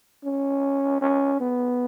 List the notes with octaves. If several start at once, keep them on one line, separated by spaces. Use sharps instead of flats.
C#4
C#4
B3